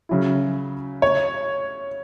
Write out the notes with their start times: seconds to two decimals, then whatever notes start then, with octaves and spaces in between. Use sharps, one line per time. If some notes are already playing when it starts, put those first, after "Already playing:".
0.09 C#3 F#3 C#4 E4
1.02 C#5